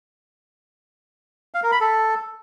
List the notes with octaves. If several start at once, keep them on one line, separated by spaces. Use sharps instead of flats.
F5
A#4
B5
A4